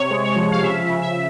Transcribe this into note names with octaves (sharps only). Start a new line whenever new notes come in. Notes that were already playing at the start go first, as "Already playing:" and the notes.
Already playing: C3 C#5
G#3
C#5
F3
F5
C#3 E5
C#3
E5